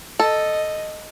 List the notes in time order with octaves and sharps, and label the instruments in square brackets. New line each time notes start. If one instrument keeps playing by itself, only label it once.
[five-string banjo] A4 [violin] D#5